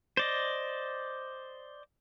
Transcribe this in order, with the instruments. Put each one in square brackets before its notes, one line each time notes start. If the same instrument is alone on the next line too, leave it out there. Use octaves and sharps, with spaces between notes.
[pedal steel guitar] C5 D5 D#5